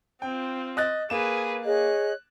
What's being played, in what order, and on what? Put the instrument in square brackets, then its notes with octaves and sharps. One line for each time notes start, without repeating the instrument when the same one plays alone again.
[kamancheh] C4 F4 [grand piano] G5
[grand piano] D#5 F#6 A6
[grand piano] A#3 E7 [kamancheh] G#4 B4
[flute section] G#4 C#5 D#5 [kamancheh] F#6